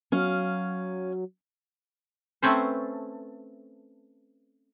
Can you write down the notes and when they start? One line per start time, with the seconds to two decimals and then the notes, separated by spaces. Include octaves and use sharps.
0.12 F#3 C#4 F5
2.42 A3 C4 C#4 B4 C5